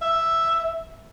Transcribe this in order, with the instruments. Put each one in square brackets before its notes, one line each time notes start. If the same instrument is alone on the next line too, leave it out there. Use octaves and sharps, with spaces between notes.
[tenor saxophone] E5